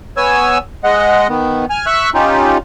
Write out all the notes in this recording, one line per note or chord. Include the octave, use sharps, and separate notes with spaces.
B3 C#5 G#5 E6
G#3 D#5 F#5
D#3 B3
G#5 F6
E5 C#6 E6 F#6
C#4 D#4 F4 G4